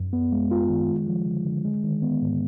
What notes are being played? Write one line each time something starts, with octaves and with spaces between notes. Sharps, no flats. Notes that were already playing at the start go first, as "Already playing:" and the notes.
Already playing: F#2
B3
G#3
F4
D#3
G#3
F3
D3
D3
G#3
D#3
B3
G#2